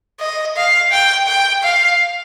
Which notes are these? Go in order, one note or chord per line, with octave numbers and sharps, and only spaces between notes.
D#5
F5
G5
G5
F5